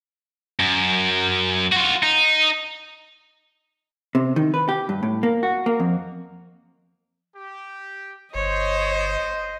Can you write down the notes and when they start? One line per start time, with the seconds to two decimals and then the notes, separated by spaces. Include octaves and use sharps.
0.60 F#2
1.73 F4 F#4
2.03 D#4
4.15 C3
4.36 D#3
4.54 B4
4.69 G4
4.89 G2
5.03 A2
5.23 A#3
5.43 F#4
5.66 A#3
5.80 F2
7.36 G4
8.35 G1 C5 C#5 D#5